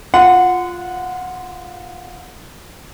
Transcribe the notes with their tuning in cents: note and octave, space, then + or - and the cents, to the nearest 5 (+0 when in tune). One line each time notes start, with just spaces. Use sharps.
F4 +5 F#5 -15 C6 -30